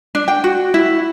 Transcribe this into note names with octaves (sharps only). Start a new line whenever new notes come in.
D4
G5
F#4
E4